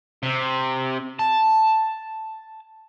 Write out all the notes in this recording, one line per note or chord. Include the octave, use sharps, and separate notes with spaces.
C3
A5